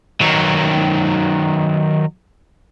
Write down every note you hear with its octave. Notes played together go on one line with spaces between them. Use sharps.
D#3 F#3